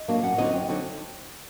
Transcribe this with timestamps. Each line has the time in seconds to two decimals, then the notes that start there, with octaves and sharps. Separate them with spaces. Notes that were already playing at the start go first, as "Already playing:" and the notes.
Already playing: D#5
0.08 F#3 A#3 D4
0.23 F#2 F#5
0.38 D3 F#3 C4 D#4 D#5
0.52 F#2 G5
0.69 D3 F#3 C4 D#4